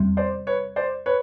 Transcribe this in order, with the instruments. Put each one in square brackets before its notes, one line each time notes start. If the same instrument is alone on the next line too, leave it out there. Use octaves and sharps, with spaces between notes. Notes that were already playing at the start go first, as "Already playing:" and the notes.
Already playing: [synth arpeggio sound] E2 C3 G3
[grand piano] C5 D5
B4 C#5
C5 D5
B4 C#5